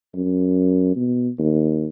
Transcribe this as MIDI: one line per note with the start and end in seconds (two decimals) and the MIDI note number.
0.15 0.96 42
0.96 1.29 47
1.39 1.87 39